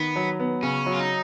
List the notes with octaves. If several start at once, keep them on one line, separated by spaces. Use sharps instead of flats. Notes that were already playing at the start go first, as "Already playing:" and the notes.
Already playing: D#3 B3
F#3
B3
C#3 C#4
F#3
F4
D#4